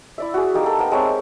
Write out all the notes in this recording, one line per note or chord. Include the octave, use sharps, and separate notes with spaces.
E4 D5 E5
F#4 G#4
A#3 D#4 G4
A4
A#3 B3 G5 A5
G#3 C4 C#5 E5